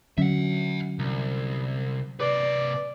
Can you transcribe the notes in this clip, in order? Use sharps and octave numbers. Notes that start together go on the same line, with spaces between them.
D3 F#3 C#4 E5 F#5
C2
C3 B4 D5